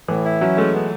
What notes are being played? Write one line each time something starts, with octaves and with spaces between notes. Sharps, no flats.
A2 E3
E4
F#3 C#4
G#3 A3
B3